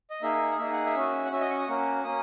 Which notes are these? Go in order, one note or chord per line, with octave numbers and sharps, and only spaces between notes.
D#5
A#3 D#4 G#4 E5
A#3 D#4 G#4 E5
F#5
E5
C#4 F#4
F#5
C#4 F#4 E5
D#5
C#6
D#6
A#3 C#4 F#4
A#3 C#4 D#6